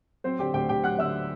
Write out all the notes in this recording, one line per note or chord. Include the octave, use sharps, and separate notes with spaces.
F#3 C4 C5
D3 G4 G5
D2 G4 G5
D2 G4 G5
F#3 F#5 F#6
D3 E5 E6